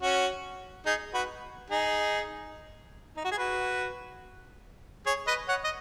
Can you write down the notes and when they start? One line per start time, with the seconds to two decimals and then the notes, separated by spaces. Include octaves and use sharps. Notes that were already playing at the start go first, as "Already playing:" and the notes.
0.02 C#4 F#4
0.86 D#4 G#4
1.14 F#4 B4
1.70 D#4 G#4
3.17 D#4
3.24 F#4
3.32 G#4
3.38 F#4 B4
5.06 G#4 C#5
5.27 B4 D#5
5.48 C#5 F#5
5.64 D#5